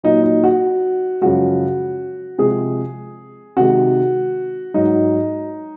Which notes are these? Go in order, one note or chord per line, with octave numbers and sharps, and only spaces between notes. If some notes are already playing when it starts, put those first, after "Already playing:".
A#2 F#3 D#4
D#4
F#4
F#2 C#3 F3 G#3 F#4
C3 F3 G#3 G#4
C3 D#3 G#3 F#4
G#2 F#3 D#4